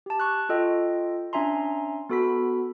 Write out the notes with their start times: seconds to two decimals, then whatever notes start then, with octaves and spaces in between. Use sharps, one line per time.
0.06 G4 A5
0.20 C#6 F#6
0.49 F4 A4 D#5 G5
1.33 C#4 D4 E5 G#5 A#5 C6
2.09 B3 F#4 A4 B5 B6